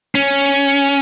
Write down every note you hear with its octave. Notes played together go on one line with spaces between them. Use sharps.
C#4